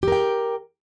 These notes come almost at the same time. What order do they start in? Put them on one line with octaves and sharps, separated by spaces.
G4 A#4 G5